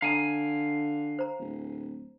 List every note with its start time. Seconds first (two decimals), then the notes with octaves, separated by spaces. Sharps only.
0.02 D3 F5 G#5 A#5
1.19 C5 A#5
1.39 D1